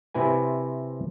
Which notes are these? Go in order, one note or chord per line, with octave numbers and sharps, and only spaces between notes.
C3 C4 E4 B4 G#5